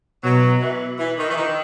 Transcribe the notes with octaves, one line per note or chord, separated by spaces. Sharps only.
B2 F#3
E3
E3
D#3
E3
D#3